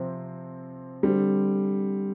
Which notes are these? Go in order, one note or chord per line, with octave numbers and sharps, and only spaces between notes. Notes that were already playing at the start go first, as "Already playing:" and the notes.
Already playing: C3 F3 C4
D3 G3 C4